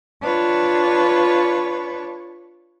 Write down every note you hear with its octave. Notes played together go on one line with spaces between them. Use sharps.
D4 F4 B4 C#5